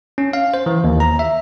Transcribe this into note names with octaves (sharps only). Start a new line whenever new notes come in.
C#4
F5
C5
E3
D#2
A#5
E5